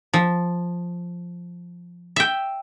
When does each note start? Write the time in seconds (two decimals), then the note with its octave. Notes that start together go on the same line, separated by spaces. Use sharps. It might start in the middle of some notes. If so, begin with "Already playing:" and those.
0.14 F3
2.16 E5 G5